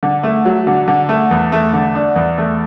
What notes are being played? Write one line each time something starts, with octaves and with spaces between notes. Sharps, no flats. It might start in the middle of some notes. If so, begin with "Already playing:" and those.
D3
A3
F#3
D3
D3
A3
E2
A3
D3
D4
E2
A3